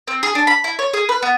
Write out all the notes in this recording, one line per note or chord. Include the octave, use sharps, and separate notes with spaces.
C4
G#4
D4
B5
E4
C#5
G#4
B4
B3